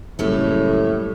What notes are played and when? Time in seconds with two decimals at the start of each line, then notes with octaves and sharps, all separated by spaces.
0.19 F#1 A2 G3 A4 C#5